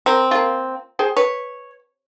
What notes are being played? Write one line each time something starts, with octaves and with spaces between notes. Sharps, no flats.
C4 A#4
A#3 F4
G#4 C5 G5
B4 C#5